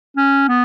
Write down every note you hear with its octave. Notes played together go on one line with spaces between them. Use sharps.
C#4
B3